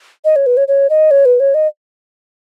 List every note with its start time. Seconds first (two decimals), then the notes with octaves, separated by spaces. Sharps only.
0.25 D#5
0.36 C#5
0.46 B4
0.57 C#5
0.68 C#5
0.90 D#5
1.11 C#5
1.25 B4
1.40 C#5
1.54 D#5